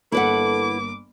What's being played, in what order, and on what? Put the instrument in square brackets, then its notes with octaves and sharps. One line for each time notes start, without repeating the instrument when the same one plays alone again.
[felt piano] G1 A#3 [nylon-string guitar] E4 B4 F#5 [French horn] A4 [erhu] D6